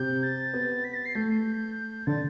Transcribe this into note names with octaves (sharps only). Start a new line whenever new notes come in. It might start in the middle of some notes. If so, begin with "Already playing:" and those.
Already playing: C3 G6
A6
B3
B6
A6
C7
A3 G6
D3 A6